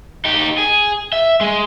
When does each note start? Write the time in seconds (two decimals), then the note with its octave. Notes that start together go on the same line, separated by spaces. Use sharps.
0.25 D#4 G4
0.58 G#4
1.12 E5
1.41 G#3